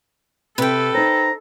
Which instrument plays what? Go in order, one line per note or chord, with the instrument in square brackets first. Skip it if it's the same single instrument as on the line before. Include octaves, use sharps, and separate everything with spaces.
[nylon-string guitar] C3 [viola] A4 [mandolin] B4 G5
[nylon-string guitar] D#4 C5 [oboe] A#5